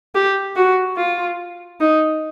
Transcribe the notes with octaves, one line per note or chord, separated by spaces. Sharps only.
G4
F#4
F4
D#4